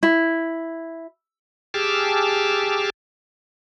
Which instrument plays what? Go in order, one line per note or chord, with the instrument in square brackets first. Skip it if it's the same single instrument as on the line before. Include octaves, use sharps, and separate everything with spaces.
[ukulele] E4
[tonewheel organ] G4 G#4 A5 D6 E6 F6